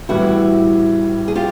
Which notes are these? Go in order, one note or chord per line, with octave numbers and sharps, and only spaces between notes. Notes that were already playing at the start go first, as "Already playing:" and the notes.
A2 E3 G3 B3 E4 F#4
G#4
F4 G4